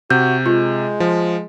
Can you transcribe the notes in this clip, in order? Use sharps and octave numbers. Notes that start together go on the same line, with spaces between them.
C3 F#4 G6
G#3 F4
F3